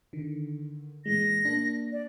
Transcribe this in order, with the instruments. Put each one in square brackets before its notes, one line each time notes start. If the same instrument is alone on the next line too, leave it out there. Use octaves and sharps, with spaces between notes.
[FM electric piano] D3 D#3
[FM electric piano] A#2 E3 G#3 [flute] A#6
[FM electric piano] A#3 D4
[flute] D5